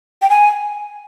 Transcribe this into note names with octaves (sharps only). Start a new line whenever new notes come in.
G5
G#5